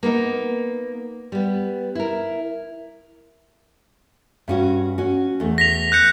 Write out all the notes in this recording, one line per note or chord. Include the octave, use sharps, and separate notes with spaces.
A#3 B3 D#4
G3 B3
E4 A#4
G2 C#4 F#4
C#4 F#4
E2 A3
A#6 B6 F7
F#6 G6 C#7